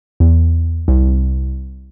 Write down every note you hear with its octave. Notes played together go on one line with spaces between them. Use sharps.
E2
C2